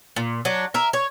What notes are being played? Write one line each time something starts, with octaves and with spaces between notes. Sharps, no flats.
A#2
F#3 D4
A#4 E5
C#5